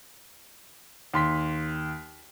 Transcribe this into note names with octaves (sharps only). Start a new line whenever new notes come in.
D#2 C6 B6